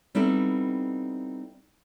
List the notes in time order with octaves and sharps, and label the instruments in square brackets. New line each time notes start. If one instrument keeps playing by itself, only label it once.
[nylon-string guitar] G3 B3 C4 D#4 E4 A4